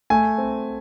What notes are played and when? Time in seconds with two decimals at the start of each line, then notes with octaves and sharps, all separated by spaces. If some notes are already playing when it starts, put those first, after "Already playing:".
0.10 A3 G#5
0.38 C4